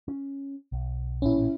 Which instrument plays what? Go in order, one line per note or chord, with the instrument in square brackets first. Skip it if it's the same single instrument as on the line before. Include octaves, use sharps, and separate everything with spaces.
[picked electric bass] C#4
B1
[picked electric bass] A1 A#2 [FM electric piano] C#4 E4